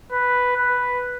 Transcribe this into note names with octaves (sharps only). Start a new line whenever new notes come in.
B4
B4